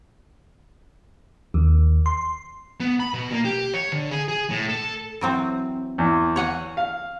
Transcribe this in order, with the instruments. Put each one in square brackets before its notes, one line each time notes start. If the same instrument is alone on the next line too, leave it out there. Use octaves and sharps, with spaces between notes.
[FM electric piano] D#2
C6
[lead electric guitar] B3
B5
B2
A#3
G4
C#5
D3
G#4
G#4
A2
A4
[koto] E3 F#3 C4
[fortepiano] E2
[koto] C#5 F#5 G#5
[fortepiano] F5